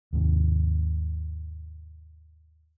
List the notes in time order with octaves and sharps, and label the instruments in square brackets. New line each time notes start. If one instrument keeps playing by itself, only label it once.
[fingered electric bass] D#2 G#2 C3